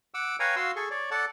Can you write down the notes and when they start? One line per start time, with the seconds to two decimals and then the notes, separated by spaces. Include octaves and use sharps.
0.14 F#5 D6 E6
0.40 B4 C#5 F5 G5 G#5 A#5
0.56 F#4 F5 C6 E6
0.76 G#4 A4 C#6
0.91 C#5 D5
1.11 A4 D5 F#5 A5